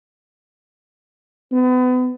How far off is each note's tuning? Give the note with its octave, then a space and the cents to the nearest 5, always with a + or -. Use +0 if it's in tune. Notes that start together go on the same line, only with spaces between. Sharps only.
B3 +35